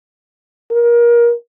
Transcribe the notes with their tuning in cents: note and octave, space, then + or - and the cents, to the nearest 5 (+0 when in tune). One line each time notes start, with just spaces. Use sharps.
A#4 +25